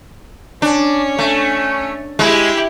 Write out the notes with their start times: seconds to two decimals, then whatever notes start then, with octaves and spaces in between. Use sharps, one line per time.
0.62 C#4 D4
1.19 A3
2.19 G#3 E4 G4